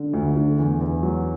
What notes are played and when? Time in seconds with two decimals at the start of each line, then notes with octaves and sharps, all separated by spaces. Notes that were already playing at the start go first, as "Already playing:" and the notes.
Already playing: D3
0.14 D2
0.37 D3
0.59 E2
0.81 E2
1.02 F#3